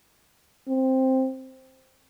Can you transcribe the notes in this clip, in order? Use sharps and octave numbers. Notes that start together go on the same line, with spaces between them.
C4